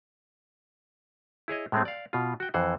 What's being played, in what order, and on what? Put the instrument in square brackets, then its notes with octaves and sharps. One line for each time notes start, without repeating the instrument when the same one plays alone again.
[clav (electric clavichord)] E4 G#4 C#5 D#5
A2 G#3 A3 C4
D5 F5
B2 F4
F#4 G5
F2 E3 C5 F#5